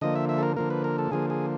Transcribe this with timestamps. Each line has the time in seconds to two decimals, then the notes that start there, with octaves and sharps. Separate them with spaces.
0.01 D3 F3 A#3 D#5
0.16 E5
0.29 E5
0.38 A4
0.43 A#4
0.56 D3 F3 A#3 A#4
0.70 B4
0.84 A#4
0.98 A4
1.11 D3 F3 A#3 G#4
1.30 G#4